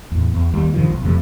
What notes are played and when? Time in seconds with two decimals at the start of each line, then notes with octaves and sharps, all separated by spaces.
0.12 E2 A2
0.34 E2
0.54 D#2 G3
0.74 G2 C3 D#3 F3
0.90 B1
1.04 F2 C3 F3 A3